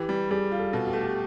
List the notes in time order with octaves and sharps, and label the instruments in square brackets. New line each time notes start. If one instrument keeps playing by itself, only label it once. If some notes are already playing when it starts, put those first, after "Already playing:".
Already playing: [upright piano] E3 [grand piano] G4
[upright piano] G3
[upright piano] G3 [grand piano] G#4
[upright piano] F4
[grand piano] A4
[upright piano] B2 [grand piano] A4
[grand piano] G4
[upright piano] A3
[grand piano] G4